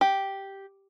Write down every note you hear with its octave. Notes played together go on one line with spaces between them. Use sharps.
G4